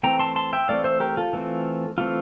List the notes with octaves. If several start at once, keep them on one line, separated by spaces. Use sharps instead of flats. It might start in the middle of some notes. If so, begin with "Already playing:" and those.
E3 A3 C4 G5 A#5
A5 C6
A5 C6
E5 G5
E3 A3 C4 D5 F5
C5 E5
G4 A#4
F4 A4
E3 A3 C4
E3 A3 C4 F4